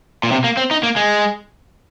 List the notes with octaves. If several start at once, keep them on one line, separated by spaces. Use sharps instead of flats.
A#2
C3
A#3
C4
D#4
A#3
G#3